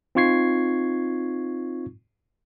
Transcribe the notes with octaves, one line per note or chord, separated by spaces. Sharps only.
C4 D#4 F4 C#6 G#6 C7